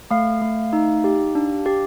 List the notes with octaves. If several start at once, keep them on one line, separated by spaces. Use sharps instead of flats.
A3 F5
A3
D#4
G4
D4
G4